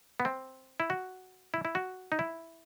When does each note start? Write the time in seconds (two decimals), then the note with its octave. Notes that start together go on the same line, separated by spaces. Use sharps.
0.20 B3
0.25 C4
0.80 E4
0.90 F#4
1.54 E4
1.65 E4
1.75 F#4
2.12 D#4
2.19 E4